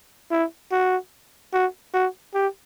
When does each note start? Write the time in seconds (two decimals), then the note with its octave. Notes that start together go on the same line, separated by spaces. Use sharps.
0.31 E4
0.72 F#4
1.53 F#4
1.94 F#4
2.34 G4